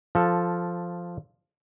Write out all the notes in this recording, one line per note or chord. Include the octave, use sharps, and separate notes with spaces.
F3 A4